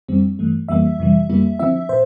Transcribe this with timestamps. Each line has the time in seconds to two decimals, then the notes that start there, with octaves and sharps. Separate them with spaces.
0.08 F2 D3 G3 C4
0.39 G2 E3 A3
0.68 F2 E3 G3 A#3 E5
0.99 F2 C3 E3 G3
1.29 F2 D3 G3 A#3 E4
1.59 D3 F3 C4 E4 E5
1.89 A#2 C5